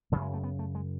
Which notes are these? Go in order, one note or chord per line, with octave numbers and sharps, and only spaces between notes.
F#2 C#3 F#3
G#3
A3
B3
A3
G#3